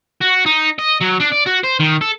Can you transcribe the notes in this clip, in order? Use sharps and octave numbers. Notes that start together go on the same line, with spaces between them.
F#4
D#4
D#5
F#3
D4
D5
F#4
C5
D#3
A4